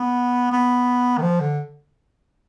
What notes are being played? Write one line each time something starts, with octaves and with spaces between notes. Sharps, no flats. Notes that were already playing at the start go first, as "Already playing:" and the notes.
Already playing: B3
B3
D#3
F3
D3